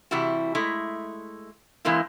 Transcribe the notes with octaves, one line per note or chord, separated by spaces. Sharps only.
C3 E3 G3 E4 F#4
G#3 A3 E4
E3 G#3 A#3 C4 E4